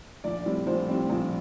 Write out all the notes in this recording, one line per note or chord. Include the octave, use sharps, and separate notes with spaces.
A#1 D5
A2 G3 C4
A#1 C5
A2 G3 C4
A#1